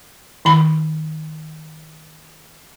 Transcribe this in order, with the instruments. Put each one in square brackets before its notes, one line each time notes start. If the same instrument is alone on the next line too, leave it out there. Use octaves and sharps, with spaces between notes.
[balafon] D#3 E4 B5